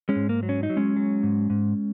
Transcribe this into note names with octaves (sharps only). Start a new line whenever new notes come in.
G#3 C#4
G#2
A#3
F#3
C#4
D#4
F#3
G#3 C#4
F#3
G#2
G#2